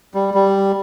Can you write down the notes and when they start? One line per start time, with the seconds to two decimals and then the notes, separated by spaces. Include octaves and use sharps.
0.14 G3
0.34 G3